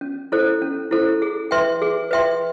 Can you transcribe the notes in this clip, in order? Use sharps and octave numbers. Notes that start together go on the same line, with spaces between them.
C#4
E4 A4 C5
C#4
E4 A4 C5
G#4
B4 E5 G5 C6
G#4
B4 E5 G5 C6